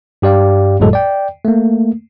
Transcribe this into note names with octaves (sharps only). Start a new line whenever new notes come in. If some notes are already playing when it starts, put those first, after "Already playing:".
G2 G4 D5 F5
G1 F2 A2 F#3 G#3 A4
D5 G5
A3 A#3